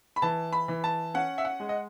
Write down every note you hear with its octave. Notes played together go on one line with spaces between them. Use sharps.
B5
E3 A5
B5
E3
A5
C#4 F#5
E5
F#5
G#3
D#5